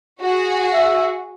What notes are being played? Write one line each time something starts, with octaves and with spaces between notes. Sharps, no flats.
F#4 G#4
E5